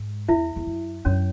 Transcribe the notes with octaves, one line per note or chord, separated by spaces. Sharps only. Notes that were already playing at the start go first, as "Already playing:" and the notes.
Already playing: G#2
E2 E4 E5
E2
F#2
F#2 C#4 C#5